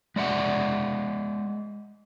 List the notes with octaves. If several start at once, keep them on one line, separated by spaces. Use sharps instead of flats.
G#3 D5 E5 F#5